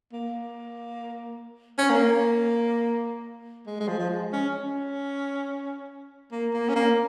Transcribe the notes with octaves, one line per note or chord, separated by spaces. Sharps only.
A#3
C#4
A#3
G#3
G#3
F3
F3
G#3
C#4
C#4
A#3
A#3
C#4
A#3